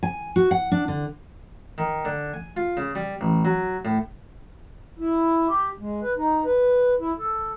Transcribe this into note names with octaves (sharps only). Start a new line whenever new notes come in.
G#5
F#4
F#5
D4
D3
D#3
D3
G#5
F4
C#3
G3
A1
F#3
A2
E4
G4
G#3
B4
D#4
B4
E4
A4